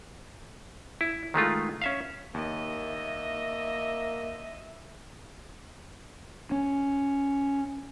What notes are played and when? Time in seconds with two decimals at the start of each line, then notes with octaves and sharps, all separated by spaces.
1.01 E4
1.34 D#3 G#3 A3 F4
1.82 C#4 E5 F5
2.34 D#2 A#3 D#5 E5
6.52 C#4